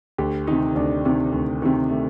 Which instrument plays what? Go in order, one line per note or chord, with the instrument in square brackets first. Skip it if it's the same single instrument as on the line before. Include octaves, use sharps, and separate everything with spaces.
[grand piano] D2 G4
C3 D#3 D#4
D2 D4
C3 D#3
D2
C3 D#3
A3